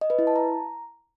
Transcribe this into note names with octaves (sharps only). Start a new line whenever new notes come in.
D#5
B4
E4
A5
A#5